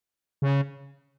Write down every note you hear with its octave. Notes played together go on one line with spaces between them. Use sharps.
C#3